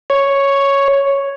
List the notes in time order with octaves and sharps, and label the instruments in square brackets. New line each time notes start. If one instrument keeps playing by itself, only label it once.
[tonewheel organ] C#5